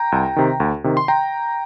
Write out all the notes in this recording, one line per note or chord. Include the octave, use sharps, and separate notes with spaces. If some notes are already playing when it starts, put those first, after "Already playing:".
Already playing: G5 A#5
C2
C3 D#3
D2
C3 D#3
C6
G5 A#5